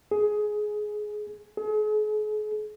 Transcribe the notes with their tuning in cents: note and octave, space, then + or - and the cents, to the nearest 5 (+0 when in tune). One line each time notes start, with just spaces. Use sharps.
G#4 +15
G#4 +40